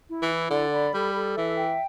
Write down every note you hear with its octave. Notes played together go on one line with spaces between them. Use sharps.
E4
E3
E4
D3 D5
B5
G3 A4
A4
E3 E5
G5